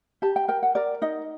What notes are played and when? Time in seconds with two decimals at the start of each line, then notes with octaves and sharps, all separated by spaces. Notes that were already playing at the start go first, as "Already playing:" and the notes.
0.22 G4 A5
0.36 G5
0.48 A#4 G5
0.63 F#5
0.75 A#4 D5
1.02 D#4 D#5